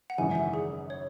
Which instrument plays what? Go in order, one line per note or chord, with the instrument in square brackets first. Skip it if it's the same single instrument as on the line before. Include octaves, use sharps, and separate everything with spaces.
[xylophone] F#5
[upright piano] G#1 F#2 C#3 E3 [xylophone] G#5
[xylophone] E5
F#5
G#4
C#5